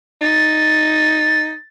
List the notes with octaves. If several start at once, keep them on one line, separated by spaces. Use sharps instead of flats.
D#4 A6